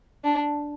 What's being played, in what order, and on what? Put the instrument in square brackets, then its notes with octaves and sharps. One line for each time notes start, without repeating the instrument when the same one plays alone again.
[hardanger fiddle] D4